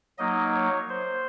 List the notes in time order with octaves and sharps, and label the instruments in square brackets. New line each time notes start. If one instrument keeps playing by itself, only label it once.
[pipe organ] F#3 A#3 D#4 D#5
C#5
C5